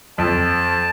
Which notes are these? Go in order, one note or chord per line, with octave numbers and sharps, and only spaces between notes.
F2 A5